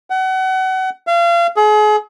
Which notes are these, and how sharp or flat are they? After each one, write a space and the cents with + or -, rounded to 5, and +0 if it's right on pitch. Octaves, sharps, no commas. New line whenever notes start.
F#5 +30
F5 -35
G#4 +35